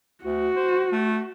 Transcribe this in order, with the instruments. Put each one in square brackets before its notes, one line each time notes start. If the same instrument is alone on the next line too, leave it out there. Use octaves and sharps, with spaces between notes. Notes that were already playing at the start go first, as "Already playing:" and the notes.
[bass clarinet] D2 [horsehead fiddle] F#4
[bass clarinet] C5
A3